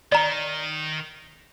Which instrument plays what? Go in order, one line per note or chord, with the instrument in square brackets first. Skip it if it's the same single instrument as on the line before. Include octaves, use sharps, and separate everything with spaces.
[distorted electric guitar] D#3 [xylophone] D5 A#5